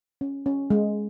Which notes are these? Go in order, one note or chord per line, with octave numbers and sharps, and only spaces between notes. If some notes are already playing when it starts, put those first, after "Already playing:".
C#4
C#4
G#3